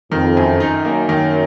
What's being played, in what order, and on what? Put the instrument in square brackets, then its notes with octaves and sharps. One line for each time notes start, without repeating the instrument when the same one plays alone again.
[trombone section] F2 [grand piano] D#3
[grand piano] F#2
D#4
[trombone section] F#2 [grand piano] A#3
[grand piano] D#3